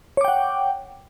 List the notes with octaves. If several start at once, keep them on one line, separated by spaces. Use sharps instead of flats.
C#5 F#5 G5 D6